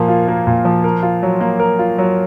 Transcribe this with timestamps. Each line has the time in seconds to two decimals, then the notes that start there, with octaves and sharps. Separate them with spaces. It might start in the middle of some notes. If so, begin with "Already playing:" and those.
Already playing: A#2 F3 A#3
0.08 F4
0.28 A#3
0.47 A#2
0.65 F3
0.84 A#4
1.03 F4
1.23 F#3
1.40 A#3
1.59 A#4
1.79 F4
1.98 F#3